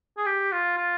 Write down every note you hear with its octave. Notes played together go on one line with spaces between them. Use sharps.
G#4
G4
F4
F4